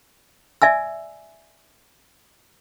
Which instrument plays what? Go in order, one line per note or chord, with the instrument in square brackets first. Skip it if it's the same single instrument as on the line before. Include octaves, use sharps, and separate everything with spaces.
[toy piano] D5 E5 G#5 E6